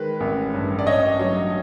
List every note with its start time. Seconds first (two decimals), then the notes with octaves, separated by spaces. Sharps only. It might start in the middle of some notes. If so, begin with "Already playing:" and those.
Already playing: D#3 G#3 B4
0.20 A1
0.54 G2
0.79 D5
0.87 A1 C#5 D#5
1.19 F#3